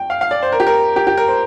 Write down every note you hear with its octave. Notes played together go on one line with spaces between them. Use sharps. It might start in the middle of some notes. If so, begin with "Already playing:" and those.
Already playing: G5
F5
F5
D5
C5
A#4
G4
A#4
G4
G4
A#4
C5